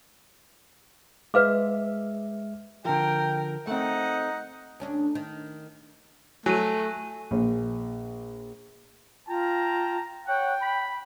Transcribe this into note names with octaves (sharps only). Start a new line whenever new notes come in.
G#3 B4 E5 F5 D6
D3 F3 A#4 G5
A3 C4 D#4 F#5
D2 C#4 D4
D#3
F#3 A3 G#5 D#7
A#1
F4 G5 A5 A#5
C#5 F#5 G5
B5